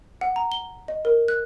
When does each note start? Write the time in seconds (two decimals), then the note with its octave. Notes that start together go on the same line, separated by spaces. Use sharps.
0.21 F#5
0.36 A#5
0.52 G7
0.88 D#5
1.05 A#4
1.28 F#6